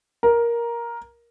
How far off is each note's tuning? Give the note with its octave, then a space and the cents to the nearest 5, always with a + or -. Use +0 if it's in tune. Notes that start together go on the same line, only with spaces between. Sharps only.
A#4 +10